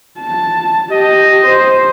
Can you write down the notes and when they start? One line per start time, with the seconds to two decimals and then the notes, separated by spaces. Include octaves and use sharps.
0.19 A5
0.91 G4 D#5
1.45 C5